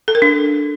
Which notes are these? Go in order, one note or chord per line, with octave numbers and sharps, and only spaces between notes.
A4
A#4
D4